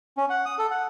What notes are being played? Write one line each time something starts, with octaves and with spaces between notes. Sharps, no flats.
C#4
F#5
D#6
A4
F#5